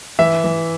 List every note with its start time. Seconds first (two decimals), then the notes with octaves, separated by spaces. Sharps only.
0.19 E3 E5
0.44 E3